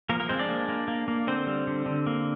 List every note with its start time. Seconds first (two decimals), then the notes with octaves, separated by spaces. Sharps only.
0.09 F3 A#3 A#4
0.20 A#3 A#4
0.29 G#3 C4 C5
0.39 D4 D5
0.49 A#3
0.69 A#3
0.88 A#3
1.08 A#3
1.27 D3 C4 C5
1.47 G3
1.67 D3
1.86 D3
2.07 A#3